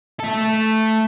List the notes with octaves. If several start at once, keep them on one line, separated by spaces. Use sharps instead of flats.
A3 A4